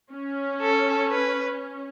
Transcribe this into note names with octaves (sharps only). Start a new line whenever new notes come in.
C#4
A4
B4